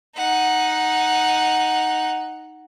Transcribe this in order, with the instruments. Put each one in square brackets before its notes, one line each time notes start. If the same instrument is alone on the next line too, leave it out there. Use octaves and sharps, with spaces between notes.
[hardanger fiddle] D#4 F#5